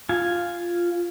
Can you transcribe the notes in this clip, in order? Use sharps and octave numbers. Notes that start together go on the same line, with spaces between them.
F4 G#5